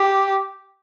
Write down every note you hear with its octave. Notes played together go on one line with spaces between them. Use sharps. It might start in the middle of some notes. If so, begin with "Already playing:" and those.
Already playing: G4